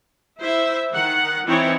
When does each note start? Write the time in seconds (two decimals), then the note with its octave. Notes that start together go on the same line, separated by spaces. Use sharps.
0.40 E4 C5 E5
0.93 D#3 F#5
1.46 E3 C4 D#4 E4 C#5